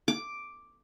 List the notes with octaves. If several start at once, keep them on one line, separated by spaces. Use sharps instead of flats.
D6